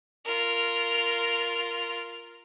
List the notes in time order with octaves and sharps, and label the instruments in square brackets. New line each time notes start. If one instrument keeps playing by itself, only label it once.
[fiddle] F4 A#4